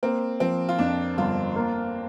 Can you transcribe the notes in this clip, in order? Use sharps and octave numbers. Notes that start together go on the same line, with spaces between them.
A#3 C4
F3 C4
F4
F2 D4
G1 F4
A#3